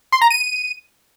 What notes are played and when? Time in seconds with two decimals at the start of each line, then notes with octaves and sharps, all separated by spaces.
0.12 C6
0.21 A#5
0.30 D#7